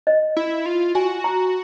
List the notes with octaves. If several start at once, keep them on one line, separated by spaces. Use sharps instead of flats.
D#5
E4
F4
F#4 G#5
A#5